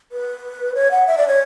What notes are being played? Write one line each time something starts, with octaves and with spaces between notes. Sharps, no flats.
B4
C#5
F#5
E5
D5
C#5